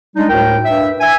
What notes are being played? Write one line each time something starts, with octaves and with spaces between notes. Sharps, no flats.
G3 G#3 D4 D#4
D2 A2 A#4 G5
G2 E5
E5 G#5